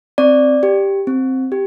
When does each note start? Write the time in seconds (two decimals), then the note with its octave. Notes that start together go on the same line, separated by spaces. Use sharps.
0.18 C4 D5
0.63 G4
1.07 C4
1.52 G4